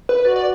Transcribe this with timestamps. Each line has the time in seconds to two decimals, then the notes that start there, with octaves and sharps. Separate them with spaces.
0.09 B4
0.25 F#4 D5
0.36 D5